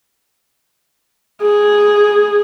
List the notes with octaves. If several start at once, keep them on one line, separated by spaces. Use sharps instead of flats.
G#4